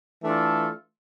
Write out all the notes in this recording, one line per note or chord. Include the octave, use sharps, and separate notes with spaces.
E3 A3 D4 F4 A4